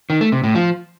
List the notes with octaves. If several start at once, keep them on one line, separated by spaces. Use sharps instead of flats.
D#3
A3
C3
A2
F3